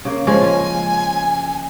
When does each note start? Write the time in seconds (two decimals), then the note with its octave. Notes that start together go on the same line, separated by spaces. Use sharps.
0.05 C#3 A#3
0.27 F3 G#3 C#4 G#5
0.42 F4